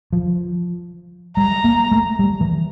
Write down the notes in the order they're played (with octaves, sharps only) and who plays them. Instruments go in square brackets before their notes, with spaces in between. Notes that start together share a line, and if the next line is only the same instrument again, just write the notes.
[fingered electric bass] F3
[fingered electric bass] G3 [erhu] A#5
[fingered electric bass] A#3
A3
G3
E3